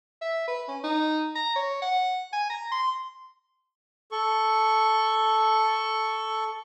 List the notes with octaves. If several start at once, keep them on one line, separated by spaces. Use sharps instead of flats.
E5
B4
C#4
D#4
A#5
C#5
F#5
G#5
A#5
C6
A4 C#6